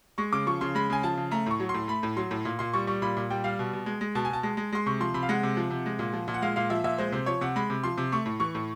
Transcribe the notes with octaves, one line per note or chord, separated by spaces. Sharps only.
G#3 C#6
C#3 D6
F3 C#6
C#3 C6
G#3 B5
C#3 G#5
F3 A5
C#3
A3 A#5
A2 C#6
F#3
C6
A2
A3 B5
A2
F#3 C6
A2
A#2
A#2 C6
G3 C#6
G3 C#6
A#2 B5
A#2
G3 G5
G3 F5
B2
B2
G#3
G#3
B2 A5
G#5
B2 A5
G#3
G#3
G#3 C6
C3 C#6
F3 C6
C3 B5
F5
G#3 F#5
C3
F3
C3
G#3
A#2
F3
A#2
F#5
G#3 F5
A#2 F5
F3 E5
A#2 E5
G#3 C5
C3 C5
F3 C#5
C3 F#5
G#3 B5
C3
F3 C6
C3
A3 C#6
A2
E3 C#6
A2